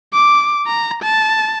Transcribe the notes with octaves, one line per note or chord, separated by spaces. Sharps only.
D6
A#5
A5